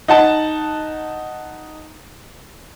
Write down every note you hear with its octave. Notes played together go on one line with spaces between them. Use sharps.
D#4 F#5 A5